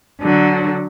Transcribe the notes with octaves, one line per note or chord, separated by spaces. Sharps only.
D3 F#3